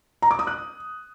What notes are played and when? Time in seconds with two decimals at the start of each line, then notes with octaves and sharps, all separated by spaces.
0.22 A#5
0.31 D6
0.39 D#6
0.47 F#6